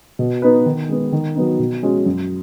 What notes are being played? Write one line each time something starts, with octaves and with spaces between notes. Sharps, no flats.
B2
B3 D#4 B4
D#3
G#3 B3
D#3
F#3 B3 D#4
B2
G#3 C#4 F#4
F#2